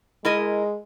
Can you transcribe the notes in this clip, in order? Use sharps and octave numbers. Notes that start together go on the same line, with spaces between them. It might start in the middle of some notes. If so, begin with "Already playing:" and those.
G#3 E4 A#4 D#5